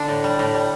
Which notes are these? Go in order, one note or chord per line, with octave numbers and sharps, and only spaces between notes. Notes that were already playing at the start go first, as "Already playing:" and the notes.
Already playing: D3 D4
A2
G3
A2
G3